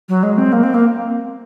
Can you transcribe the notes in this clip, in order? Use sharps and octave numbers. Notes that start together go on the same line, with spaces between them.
F#3
G#3
C4
A#3
C4
A#3